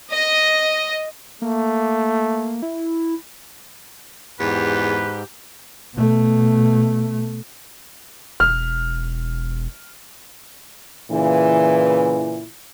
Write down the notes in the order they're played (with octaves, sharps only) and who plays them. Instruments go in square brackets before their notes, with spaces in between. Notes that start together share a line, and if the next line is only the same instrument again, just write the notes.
[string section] D#5
[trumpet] A3 [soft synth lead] A#3
[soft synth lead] E4
[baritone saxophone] E2 [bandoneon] G#2 [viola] G4 [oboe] B4
[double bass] B2 A3
[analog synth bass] E1 [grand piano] F6
[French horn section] A#2 C#3 E3